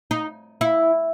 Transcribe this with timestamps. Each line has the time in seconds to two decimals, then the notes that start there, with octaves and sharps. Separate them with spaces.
0.11 D#4
0.61 E4